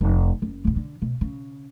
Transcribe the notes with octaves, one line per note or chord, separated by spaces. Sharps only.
F1 D2
F#1
E2 C3
D3
B2
C#3